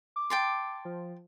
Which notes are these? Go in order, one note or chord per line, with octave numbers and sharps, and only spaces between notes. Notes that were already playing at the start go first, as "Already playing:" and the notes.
D6
G5 A5 C6
F3